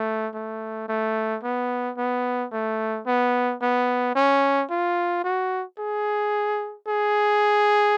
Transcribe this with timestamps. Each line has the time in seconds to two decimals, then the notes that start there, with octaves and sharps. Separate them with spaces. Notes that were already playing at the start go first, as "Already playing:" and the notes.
Already playing: A3
0.34 A3
0.89 A3
1.43 B3
1.97 B3
2.52 A3
3.06 B3
3.61 B3
4.15 C#4
4.70 F4
5.24 F#4
5.78 G#4
6.88 G#4